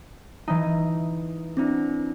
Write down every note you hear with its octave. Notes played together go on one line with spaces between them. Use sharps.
E3 D#4
C4 D4 E4